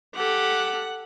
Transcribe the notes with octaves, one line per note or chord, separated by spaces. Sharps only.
G4 A4 F#5